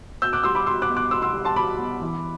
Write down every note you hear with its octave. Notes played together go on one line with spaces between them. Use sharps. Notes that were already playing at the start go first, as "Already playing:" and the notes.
B2 E6 G6
D6 F#6
G3 C6 E6
B5 D6
B2 C6 E6
D6 F#6
B3
D6 F#6
B2 C6 E6
C6 E6
G3
A5 C6
B2 B5 D6
B3
E3